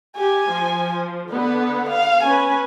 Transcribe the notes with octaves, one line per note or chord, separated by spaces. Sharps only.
G4 G#5
F3
D3 B3 B4
F5
C#4 B4 G#5